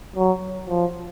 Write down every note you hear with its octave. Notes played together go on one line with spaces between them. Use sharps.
F#3
F3